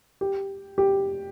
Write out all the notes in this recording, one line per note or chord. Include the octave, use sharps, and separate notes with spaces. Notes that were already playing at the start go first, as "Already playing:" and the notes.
G4
G4